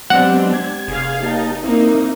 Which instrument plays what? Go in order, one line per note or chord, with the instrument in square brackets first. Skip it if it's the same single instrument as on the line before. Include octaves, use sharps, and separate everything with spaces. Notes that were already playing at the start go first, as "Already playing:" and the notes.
[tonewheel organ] F#3 B3 [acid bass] G#3 [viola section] C4 D4 G4 [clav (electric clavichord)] F#5
[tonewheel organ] G#6
[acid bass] F1 [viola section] G#4 F5
[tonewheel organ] A#3 G4 A5 [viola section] D#4
[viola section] A#3 D#4 [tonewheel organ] C4 E4